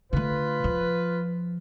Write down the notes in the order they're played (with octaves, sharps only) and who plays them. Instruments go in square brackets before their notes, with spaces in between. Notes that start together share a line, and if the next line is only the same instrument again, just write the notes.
[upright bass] D3 A3 [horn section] F4 B4
[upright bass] F3